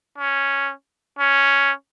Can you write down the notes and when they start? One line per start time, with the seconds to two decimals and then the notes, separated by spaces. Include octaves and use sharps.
0.18 C#4
1.19 C#4